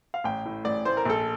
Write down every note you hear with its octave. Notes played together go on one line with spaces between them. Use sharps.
F5
A1 G5
A2
A1 D5
A2 C5
A#4
A#1 A4